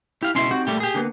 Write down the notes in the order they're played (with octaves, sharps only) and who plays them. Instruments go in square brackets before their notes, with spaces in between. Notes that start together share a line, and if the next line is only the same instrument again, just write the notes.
[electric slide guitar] E4 [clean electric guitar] G4 F5
[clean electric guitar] C#2 B2 C6 [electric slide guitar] C#4 E4 E5
[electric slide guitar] C4 D#4 G4 [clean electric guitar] F#4
[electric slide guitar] A#2 [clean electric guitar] G3 A3 G4
[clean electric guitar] G4 G#4
[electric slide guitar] D3 A#3 B3